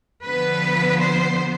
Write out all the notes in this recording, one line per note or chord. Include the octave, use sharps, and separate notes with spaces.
D3 F3 B3 B4
C5